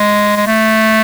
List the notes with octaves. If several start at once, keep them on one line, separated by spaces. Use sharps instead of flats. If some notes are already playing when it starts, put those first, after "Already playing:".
Already playing: G#3
G#3
A3